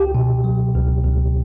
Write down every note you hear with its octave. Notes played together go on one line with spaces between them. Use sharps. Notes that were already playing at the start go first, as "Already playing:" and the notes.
Already playing: C#2 G4
B2
F#3
C#2
C#2